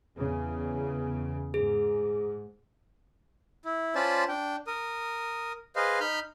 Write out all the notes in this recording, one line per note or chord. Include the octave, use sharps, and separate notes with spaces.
E2 C#3
G#2 G#4
E4
C#4 F4 C5 D5 A5 B5
D4 G5
A#4 D#6
G#4 B4 C5 D#5 F5
D#4 B5 F6 G6